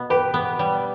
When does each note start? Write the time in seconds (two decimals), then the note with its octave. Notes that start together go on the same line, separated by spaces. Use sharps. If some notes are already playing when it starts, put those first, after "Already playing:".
Already playing: B2 B3
0.10 G4 B4
0.34 B3
0.59 G3